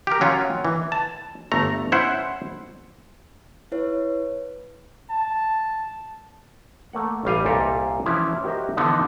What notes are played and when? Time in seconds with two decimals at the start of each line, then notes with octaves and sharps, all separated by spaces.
0.07 G4 A#4
0.21 F#3 C#4 F4
0.65 E3
0.92 A5
1.52 G1 A3 A#5
1.92 C#4 E4 C5 F#5
3.72 E4 B4 C#5
5.10 A5
6.93 A3 A#3 F#5
7.25 A1 G3 F5 G#5
7.45 C2 A#2 G4 A4 D#5 F5
8.06 E3 F3 C#4 E4
8.44 F#4 G4 A#4 C5 D#5 E5
8.77 D3 E3 F3 B3 D#4